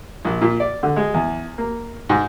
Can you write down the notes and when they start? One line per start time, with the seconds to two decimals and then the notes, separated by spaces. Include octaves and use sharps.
0.25 A#1
0.41 A#2
0.60 D5
0.83 D3
0.96 G#3
1.14 E2
1.58 A#3
2.09 G#2